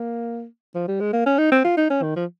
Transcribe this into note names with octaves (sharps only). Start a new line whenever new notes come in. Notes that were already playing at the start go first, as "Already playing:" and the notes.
Already playing: A#3
F3
G3
G#3
A#3
C#4
D#4
C4
F4
D#4
C#4
D#3
F3